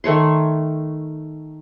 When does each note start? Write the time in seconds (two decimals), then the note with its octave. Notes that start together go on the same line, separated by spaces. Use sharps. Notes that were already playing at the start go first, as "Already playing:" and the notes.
0.04 D#3 A3 C#5 C6